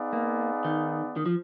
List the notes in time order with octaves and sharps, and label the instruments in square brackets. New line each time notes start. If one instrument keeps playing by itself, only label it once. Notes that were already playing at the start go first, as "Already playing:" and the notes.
Already playing: [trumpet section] B3 D#4 G#4 D5 F5
[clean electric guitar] A#3
D#3
D#3
F3